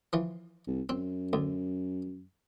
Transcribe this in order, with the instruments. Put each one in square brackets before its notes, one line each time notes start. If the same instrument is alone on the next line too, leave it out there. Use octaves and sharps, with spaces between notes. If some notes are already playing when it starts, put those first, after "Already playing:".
[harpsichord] E3 F3
[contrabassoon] C2
[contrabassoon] F#2 [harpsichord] C4
[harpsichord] D2